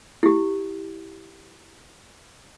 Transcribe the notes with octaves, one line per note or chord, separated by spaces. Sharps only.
E4 G4